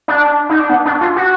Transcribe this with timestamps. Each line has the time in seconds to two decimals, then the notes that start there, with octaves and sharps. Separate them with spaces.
0.08 D4
0.49 D#4
0.59 D4
0.70 B3
0.85 D4
1.01 F4
1.16 F#4